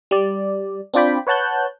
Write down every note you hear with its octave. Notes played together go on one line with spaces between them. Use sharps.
G3 D5
C4 D4 F4 D5 G5 B5
B4 C#5 F#5 A5 F#6 G6